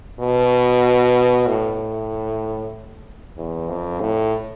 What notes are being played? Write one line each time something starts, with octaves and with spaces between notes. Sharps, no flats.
B2
A2
E2
F2
A2